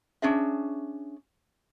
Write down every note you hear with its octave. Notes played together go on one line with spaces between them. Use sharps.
C#4 D4 G#4 E5